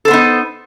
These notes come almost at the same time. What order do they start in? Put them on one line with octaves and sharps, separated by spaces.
A4 C5 B3 D#4